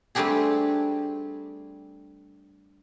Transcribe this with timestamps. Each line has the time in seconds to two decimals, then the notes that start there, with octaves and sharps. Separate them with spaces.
0.15 G3 A3 C4 D4 G4 G#4